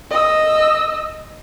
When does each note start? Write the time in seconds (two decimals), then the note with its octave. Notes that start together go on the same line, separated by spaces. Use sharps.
0.11 D#5 E6